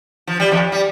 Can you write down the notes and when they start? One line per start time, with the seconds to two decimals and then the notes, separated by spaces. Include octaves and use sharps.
0.27 F3
0.40 G3
0.51 F2 F3
0.72 G3